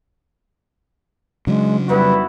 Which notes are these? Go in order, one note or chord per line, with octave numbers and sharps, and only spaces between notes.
C#3 F#3 G#3 D4
F2 G3 B3 D#4 E4 F#4 B4